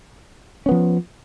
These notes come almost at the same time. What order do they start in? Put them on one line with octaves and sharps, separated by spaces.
C#4 B3 F3